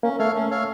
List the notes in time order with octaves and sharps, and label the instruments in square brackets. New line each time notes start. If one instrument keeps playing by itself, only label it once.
[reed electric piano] A#3 [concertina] C#4
[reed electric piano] A3 [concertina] A4 C#5 F5
[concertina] C#4
A4 C#5 F5